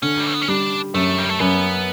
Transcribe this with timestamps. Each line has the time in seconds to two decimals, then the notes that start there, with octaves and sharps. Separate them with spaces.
0.02 D3 C#4
0.20 G3
0.26 A3
0.33 B3
0.41 C#4
0.48 G3 D4
0.94 F#2 A3
1.18 G3
1.29 A3
1.39 F#2 B3